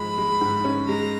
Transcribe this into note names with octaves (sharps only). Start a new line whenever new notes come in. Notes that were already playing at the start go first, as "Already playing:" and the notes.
Already playing: G#2 F3 G#3 B5
G#3
G#2
C#4
G#3 A#5